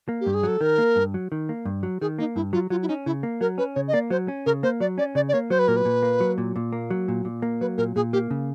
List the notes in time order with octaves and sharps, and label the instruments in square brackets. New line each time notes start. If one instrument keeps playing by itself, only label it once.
[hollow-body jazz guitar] A#3
[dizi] G4
[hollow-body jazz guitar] G2
[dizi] G#4
[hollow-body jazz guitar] F#3 [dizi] A4
[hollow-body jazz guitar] D#3 [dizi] A#4
[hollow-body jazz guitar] A#3
G2
F#3
D#3
A#3
G2
F#3
[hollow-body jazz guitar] D#3 [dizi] G#4
[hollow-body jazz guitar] A#3 [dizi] D#4
[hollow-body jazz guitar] G2 [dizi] E4
[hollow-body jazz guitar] F#3 [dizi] F4
[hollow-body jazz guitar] F#3 [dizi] F4
[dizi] E4
[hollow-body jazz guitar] C#4 [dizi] D#4
[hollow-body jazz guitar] C#3 [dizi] E4
[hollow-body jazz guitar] A#3
[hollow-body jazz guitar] F#3 [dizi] A#4
[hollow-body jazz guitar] C#4 [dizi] B4
[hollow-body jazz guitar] C#3 [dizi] C#5
[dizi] D#5
[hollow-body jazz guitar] A#3 [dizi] D5
[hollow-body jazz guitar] F#3 [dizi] C5
[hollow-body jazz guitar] C#4
[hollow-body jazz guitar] C#3 [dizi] A#4
[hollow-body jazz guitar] A#3 [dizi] C5
[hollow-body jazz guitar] F#3 [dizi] D5
[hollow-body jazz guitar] C#4 [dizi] D5
[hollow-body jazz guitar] C#3 [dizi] D5
[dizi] D5
[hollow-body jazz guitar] A#3 [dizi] C#5
[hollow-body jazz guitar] F#3 [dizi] C5
[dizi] B4
[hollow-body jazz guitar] A#2 [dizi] A#4
[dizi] B4
[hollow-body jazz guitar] A#2
A#3
F#3
A#2
A#2
A#3
F#3
A#2
A#2
A#3
[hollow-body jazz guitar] F#3 [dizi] B4
[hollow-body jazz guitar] A#2 [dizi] A#4
[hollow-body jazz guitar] A#2 [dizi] G#4
[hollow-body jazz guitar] A#3 [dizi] G4
[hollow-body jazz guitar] C#3